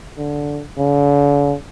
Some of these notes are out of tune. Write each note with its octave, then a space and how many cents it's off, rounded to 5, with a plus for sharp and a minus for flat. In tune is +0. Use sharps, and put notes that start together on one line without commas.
D3 -10
D3 -45